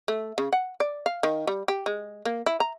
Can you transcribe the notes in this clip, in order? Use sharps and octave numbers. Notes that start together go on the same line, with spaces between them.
A3
C#3
F#5
D5
F5
D#3
G3
G4
G#3
A#3
E4
A#5